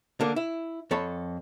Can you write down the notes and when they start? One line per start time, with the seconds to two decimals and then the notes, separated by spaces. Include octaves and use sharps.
0.21 D3 A#3
0.36 E4
0.91 F2 A4 C#5 B5